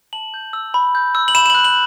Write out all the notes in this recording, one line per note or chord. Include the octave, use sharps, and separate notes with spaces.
A5 F#7
G6
E6
B5
G6
E6
F#7
B5 E7
E7
F#6 F#7
F#7